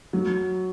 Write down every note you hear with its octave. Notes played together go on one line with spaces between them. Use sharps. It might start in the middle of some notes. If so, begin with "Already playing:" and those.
F#3